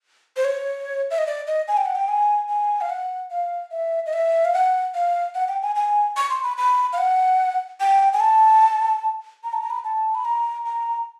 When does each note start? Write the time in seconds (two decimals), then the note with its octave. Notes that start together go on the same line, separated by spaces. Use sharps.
0.37 C5
0.45 C#5
1.11 E5
1.18 D#5
1.27 D5
1.47 D#5
1.68 G#5
1.77 G5
1.85 F#5
1.95 G5
2.08 G#5
2.49 G#5
2.81 F5
2.89 F#5
3.31 F5
3.71 E5
4.06 D#5
4.13 E5
4.45 F5
4.54 F#5
4.94 F5
5.35 F#5
5.48 G5
5.62 G#5
5.75 G#5
6.17 C#6
6.30 C6
6.43 B5
6.58 B5
6.93 F5
6.98 F#5
7.80 G5
8.13 G#5
8.20 A5
9.44 A#5
9.53 A5
9.62 A#5
9.70 B5
9.84 A5
10.15 B5
10.25 A#5
10.66 A#5